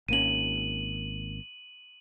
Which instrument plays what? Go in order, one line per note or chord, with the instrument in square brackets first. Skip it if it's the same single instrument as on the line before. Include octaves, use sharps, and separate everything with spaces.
[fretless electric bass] G#1 A#3 C#4 [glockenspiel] D#7 F#7